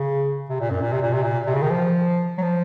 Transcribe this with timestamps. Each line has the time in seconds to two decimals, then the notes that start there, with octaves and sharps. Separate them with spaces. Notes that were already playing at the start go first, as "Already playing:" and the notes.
Already playing: C#3
0.50 C3
0.60 A#2
0.71 F#2
0.82 A#2
0.92 C3
1.02 A#2
1.13 C3
1.23 A#2
1.46 C3
1.55 C#3
1.63 D#3
1.71 F3
2.38 F#3
2.42 F3